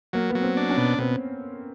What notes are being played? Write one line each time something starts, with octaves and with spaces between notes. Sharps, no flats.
F#3 A#3
B3
F#3
C4
D4
C#4
B2
B2 C4